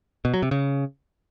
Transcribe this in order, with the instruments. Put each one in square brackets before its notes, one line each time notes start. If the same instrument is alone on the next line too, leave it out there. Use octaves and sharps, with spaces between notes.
[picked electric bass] B2
F#3
C3
C#3